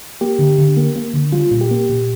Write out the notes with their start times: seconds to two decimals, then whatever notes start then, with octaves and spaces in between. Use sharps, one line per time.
0.21 A#3 G4
0.39 D3
0.58 D3
0.77 A#3
0.96 A#3
1.14 D3
1.32 G3 F4
1.51 A#2
1.61 G4
1.71 A#3
1.89 A#2